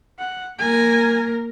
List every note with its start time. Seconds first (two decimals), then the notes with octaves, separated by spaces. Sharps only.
0.19 F#5
0.59 A#3 A#4 G#5